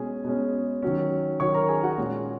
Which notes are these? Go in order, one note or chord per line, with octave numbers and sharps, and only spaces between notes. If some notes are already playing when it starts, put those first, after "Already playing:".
Already playing: B2 G#3 C#4 G#4 G#5
B2 G#3 C#4
D#3 F#3 C#4
D#3 F#3 C#4 C#5 C#6
A#4 A#5
G#4 G#5
F#4 F#5
A#2 G#3 C#4